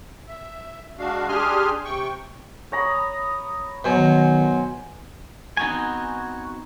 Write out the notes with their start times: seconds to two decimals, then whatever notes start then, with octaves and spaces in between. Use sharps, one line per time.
0.27 E5
0.98 G#3 D4 F#4 F5
1.28 D4 G4 G#4 G#5 C6 F6
1.85 C3 G5 C#6
2.72 C#5 A#5 B5 D#6
3.84 B2 F#3 C5 G#5
3.96 D#3
5.57 B3 C4 D#4 F#4 G#5